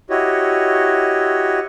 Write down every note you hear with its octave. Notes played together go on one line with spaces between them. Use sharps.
E4 F#4 G4 C#5 D#5